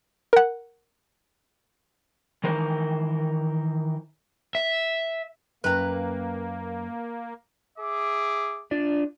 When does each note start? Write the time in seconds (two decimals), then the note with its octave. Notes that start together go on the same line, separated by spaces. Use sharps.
0.33 A#4 F#5
2.44 D#3 E3 A#4 C5
4.55 E5
5.64 F#2 A#3 B4 G5 A#5
7.79 G#4 E5 D6
8.71 D4 F4 D5